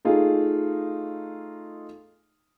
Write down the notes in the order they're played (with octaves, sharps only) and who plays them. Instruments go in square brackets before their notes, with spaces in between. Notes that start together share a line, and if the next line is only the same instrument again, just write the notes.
[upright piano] A3 D#4 F4 G#4